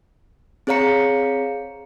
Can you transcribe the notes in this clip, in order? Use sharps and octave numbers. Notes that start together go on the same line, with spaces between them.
C4 G#4 C#5 F5 A#5 C#7